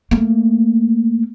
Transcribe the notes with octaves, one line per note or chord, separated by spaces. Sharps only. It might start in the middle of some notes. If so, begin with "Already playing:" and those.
A3 A#3